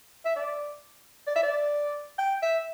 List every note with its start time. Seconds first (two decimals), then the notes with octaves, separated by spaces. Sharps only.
0.25 E5
0.36 D5
1.27 D5
1.36 E5
1.43 D5
2.19 G5
2.42 E5